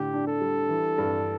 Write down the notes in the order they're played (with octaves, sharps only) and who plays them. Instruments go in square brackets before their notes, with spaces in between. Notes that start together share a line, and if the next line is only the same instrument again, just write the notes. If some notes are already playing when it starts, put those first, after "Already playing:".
Already playing: [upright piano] A2 D3 [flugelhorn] G4
[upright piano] D4
[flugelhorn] A4
[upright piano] G3
E3
G2